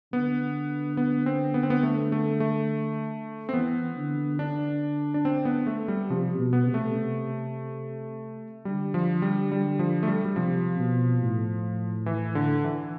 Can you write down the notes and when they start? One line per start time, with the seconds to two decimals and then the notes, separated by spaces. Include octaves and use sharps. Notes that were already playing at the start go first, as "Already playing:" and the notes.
0.12 D3 B3
0.97 B3
1.26 C4
1.54 B3
1.63 C4
1.70 B3
1.83 A3
2.12 A3
2.40 A3
3.49 C4
3.53 E3 B3
3.97 D3
4.39 D4
5.14 D4
5.25 C4
5.45 B3
5.67 A3
5.88 G3
6.10 C3 F3
6.38 B2
6.53 B3
6.67 C3
6.74 A3
6.95 C3
8.65 D3 G3
8.94 F3
9.22 G3
9.52 G3
9.79 F3
10.03 A3
10.08 G3
10.25 G3
10.36 C3 F3
10.79 B2
11.22 A2
12.06 E3
12.35 D3
12.64 E3